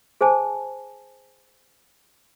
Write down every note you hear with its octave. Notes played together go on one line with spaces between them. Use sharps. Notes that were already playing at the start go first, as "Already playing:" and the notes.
G#4 C5 G#5 A5